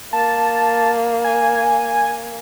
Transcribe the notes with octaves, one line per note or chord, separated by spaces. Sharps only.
A#3 A5
G#5